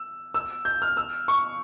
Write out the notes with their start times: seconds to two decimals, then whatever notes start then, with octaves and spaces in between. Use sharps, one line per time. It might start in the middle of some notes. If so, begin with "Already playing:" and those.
Already playing: E6
0.34 E6
0.65 G6
0.82 F6
0.97 E6
1.28 C#6